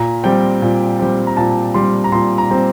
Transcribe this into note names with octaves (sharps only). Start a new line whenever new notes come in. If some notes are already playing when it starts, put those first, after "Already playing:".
Already playing: A#2 A#5
G3 C4 G5
A#2
G3 C4
A#5
A#2 A5
G3 C4 C6
A#5
A#2 C6
A#5
G3 C4